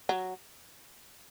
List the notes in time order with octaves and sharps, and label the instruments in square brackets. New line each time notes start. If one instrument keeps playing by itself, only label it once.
[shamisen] F#3